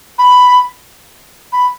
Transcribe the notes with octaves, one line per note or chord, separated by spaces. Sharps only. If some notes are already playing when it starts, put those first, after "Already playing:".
B5
B5